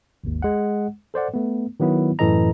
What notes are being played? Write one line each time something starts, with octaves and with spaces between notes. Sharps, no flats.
G#1 D#2
G#3 F#5
A4 C5 D5 F#5
A3 B3
D#3 F#3 B3 E4
F#2 A2 E3 A4 D#5 A#5